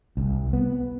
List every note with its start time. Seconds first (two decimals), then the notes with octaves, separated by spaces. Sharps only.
0.17 C2
0.53 B3